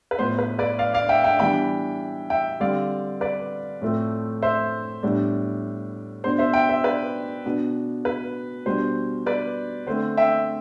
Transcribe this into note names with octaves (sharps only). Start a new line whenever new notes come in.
B4
A2 F3 B3 C5
B4
B4 D5
D5 F5
D5 F5
E5 G5
E5 G5
E3 G3 B3 D4 G5 B5
E5 G5
D3 G3 C4 D5 F5
B4 D5
A2 F3 A3 C4
C5 E5
A2 G3 B3 D4
B2 B3 D4 C5
C5 E5
E5 G5
C5 E5
B4 D5
B2 B3 D4
B4
B2 G3 D4 C5
B4 D5
D3 A3 C4 C5
E5 G5